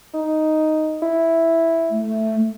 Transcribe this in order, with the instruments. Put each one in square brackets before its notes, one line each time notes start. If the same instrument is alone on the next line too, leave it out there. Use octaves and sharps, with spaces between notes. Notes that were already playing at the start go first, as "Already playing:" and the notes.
[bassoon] D#4
E4
[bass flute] A3